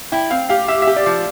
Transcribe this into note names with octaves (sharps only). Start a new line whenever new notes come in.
E4 G5
C4 F5
G4 F5
G4 E5
E5
G4
D5
F3